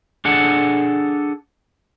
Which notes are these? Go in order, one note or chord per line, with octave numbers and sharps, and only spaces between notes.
D4 G#4 A4 F#5